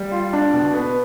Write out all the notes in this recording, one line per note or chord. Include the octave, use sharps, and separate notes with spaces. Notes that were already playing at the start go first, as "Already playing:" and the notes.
Already playing: G3
F4
D4
B2
B3